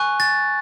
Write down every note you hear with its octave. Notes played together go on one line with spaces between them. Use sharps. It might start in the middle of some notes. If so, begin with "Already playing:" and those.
Already playing: G#5 C#6 F#6
A6